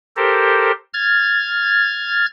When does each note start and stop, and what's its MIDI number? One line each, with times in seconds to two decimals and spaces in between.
0.16 0.72 67
0.16 0.72 69
0.16 0.72 70
0.16 0.72 72
0.93 2.26 89
0.93 2.26 92
0.93 2.26 93